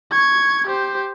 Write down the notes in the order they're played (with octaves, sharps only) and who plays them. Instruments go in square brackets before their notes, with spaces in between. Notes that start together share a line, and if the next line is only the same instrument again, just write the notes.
[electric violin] C#6 G#6
G4 C5